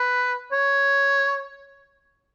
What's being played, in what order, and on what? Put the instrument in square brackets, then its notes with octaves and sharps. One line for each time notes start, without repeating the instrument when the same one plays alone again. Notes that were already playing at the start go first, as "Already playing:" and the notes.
Already playing: [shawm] B4
C#5